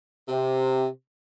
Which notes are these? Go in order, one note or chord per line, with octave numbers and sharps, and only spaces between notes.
C3